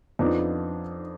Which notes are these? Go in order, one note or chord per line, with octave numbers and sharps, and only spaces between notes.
F2 F3 B3 D4 D#4